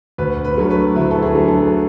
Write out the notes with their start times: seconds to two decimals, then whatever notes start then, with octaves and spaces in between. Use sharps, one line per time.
0.18 D2 B4
0.45 B4
0.58 D3 F#3 A3
0.71 B4
0.96 D2 E4
1.11 A4
1.23 G#4
1.35 D3 F#3 A3
1.48 A4